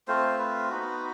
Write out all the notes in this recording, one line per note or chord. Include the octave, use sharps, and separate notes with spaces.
A3 C4 F4 C5
B4
B3 D#4 F#4